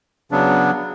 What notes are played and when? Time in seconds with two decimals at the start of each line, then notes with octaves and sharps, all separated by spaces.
0.31 C#3 F#3 B3 D4